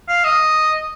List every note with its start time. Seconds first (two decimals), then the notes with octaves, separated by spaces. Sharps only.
0.09 F5
0.24 D#5